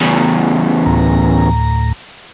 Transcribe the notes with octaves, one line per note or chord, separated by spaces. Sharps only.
E2 C#3
D2 A2 A#5